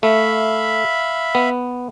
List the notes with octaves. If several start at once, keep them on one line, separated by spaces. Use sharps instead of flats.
A3 E5 F5 B5
B3